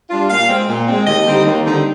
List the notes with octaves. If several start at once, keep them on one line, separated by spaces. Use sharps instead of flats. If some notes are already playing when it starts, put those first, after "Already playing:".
G3 D4 F4
A#2 F5
G#3 C4
A#2
G#3 C4
D#2 D#5
D3 G3 C4 D#4
D#2
D3 G3 C4 D#4